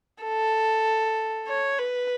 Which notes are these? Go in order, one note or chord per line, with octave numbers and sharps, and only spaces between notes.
A4
C#5
B4